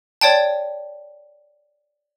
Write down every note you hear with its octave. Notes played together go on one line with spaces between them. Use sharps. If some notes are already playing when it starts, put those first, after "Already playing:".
C#5 D5 G5 A5